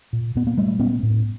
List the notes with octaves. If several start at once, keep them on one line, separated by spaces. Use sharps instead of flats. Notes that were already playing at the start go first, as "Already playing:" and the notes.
A#2
A#2 B3
A#3
A#2 G3 A3
A#2 B3 C#4
A2